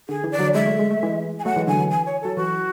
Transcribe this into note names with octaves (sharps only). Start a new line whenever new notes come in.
D3 G#4
E3
D5
D3 F#3
G#3 E5
A3
G#3
A3
E3 G#3
G#5
F#3 A3 F#5
E3 G#3
D3 F#3 G#5
E3
G#5
C#5
F#3 A4
E3 F#4